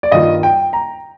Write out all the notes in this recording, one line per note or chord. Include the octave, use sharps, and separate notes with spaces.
D5
G2 D#3 A#3 F4 D#5
G5
A#5